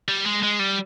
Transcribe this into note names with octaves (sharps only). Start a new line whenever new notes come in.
G3
G#3
G#3
G3